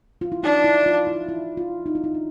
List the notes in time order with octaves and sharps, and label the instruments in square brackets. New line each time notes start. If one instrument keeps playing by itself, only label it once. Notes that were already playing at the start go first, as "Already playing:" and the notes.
[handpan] F4
E4
[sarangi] D4 [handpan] D#4
[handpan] E4
F4
E4
E4
F4
D#4
E4
D#4
D4